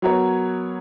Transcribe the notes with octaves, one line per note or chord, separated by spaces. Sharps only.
F#3 B3 F#4 A#4 C#5